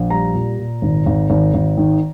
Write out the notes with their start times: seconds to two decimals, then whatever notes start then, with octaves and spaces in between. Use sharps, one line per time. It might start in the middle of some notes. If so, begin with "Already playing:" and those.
Already playing: A#1
0.10 G3 A#5
0.34 A#2
0.58 A#2
0.82 G#1
1.06 G#1
1.30 G#1
1.54 G#1
1.78 D#3